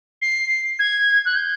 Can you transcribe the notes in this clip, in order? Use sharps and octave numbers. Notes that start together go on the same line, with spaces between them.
C7
G#6
F#6
G6